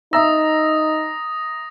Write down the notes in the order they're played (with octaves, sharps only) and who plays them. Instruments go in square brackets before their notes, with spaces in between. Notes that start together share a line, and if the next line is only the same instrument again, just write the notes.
[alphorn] D#4 [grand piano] E5 A#5 E6 [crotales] D#6 A6 A#6